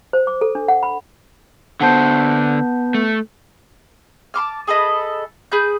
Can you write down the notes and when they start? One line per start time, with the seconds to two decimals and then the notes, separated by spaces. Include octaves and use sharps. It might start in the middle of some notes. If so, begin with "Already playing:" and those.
0.13 C5
0.27 D6
0.41 A4
0.55 D4
0.68 F#5
0.83 B5
1.81 D3 B3 C5 F#5 A5 G6
2.94 A3
4.34 A5 C6 D6 F6
4.67 G#4 A4 B4 D#5
5.52 G#4 B4 G6